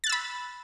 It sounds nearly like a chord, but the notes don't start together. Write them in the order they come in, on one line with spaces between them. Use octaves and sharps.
A6 F#6 E6 B5